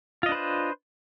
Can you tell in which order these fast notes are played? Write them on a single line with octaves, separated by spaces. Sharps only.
F4 D#5 D4 B4 C5